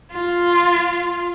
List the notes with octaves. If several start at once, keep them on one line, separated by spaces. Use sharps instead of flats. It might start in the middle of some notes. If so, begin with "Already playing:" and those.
F4